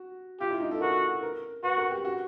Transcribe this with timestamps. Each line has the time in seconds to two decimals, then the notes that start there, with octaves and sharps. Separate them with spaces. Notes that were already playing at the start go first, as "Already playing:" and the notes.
Already playing: F#4
0.40 F4 G4
0.51 E4
0.61 D#4
0.71 A4
0.81 F#4 A#4
1.23 A#4
1.63 F#4 B4
1.78 A#4
1.91 G4
2.05 F#4